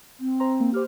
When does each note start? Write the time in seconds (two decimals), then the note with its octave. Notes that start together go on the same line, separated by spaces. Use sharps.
0.20 C4
0.40 C5 A#5 C6
0.60 A#3
0.74 G4 C5 F6